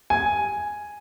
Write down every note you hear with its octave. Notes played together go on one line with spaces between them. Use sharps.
G#5